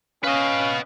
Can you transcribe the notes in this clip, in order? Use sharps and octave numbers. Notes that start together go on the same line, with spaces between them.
C#4 B4 D#5 F5